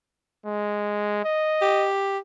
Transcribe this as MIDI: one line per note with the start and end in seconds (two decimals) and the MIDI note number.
0.46 1.21 56
1.24 1.88 75
1.61 2.18 67